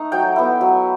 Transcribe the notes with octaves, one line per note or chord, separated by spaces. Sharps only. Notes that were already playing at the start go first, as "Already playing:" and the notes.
Already playing: A3 D#4
F#3 G5
B3 E4
F#3